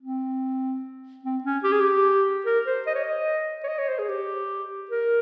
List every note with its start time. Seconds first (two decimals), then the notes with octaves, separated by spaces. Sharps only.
0.01 C4
1.24 C4
1.44 C#4
1.64 G4
1.72 G#4
1.80 G4
2.46 A#4
2.67 C5
2.87 D#5
2.95 C#5
3.03 D#5
3.64 C#5
3.68 D#5
3.79 C#5
3.89 C5
3.99 G#4
4.09 G4
4.91 A#4